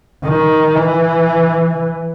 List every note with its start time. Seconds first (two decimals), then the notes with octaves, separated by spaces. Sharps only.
0.25 D#3
0.75 E3